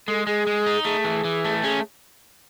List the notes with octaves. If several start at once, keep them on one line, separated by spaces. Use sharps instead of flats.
G#3 A4
G#3 G#4
G#3
D#4
A3 G#4
E3
E3
A3
C#4 G#4